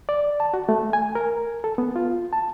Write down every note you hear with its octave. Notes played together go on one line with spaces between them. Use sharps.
D5
A5
F#4
A3
G#5
A#4
A4
B3
F4
A5